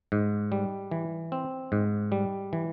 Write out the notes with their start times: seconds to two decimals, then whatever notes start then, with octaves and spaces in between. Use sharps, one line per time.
0.12 G#2
0.52 G3
0.91 E3
1.32 C4
1.72 G#2
2.12 G3
2.53 E3